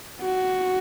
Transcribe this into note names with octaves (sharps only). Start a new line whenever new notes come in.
F#4